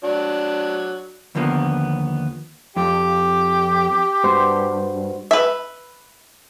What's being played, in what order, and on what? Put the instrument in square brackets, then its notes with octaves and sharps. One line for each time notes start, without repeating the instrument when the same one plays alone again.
[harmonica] F#3 D4
[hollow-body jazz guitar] D#2 D3 F3 A#3 B3
[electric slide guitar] F2 [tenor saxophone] G4
[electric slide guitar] G2 [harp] F#4 C5
[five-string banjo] B4 E5